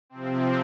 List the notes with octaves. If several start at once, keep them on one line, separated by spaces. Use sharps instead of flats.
C3 F3 C4